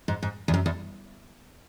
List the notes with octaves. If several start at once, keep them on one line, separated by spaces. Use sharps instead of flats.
G#2
G#2
E2
F#2
E2